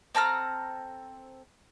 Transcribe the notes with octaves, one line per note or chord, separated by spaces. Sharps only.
C4 A4 A#5 F6